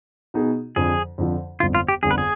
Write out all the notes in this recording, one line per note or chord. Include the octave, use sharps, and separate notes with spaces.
B2 B3 D#4 G#4
F2 D3 F3 G#4
F2 D3 F3
G1 F2 D3 F4
F4
G4
G1 F2 D3 G#4
B4
G#4